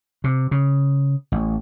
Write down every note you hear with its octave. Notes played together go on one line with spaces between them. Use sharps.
C3
C#3
A1